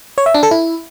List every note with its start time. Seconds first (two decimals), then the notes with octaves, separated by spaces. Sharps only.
0.18 C#5
0.26 E5
0.34 D4
0.43 A4
0.51 E4